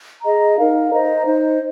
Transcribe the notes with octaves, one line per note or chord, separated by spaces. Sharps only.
G#4 D#5 A#5
D#4 A#4 F5
C5 D#5 A#5
D#4 C5 D#5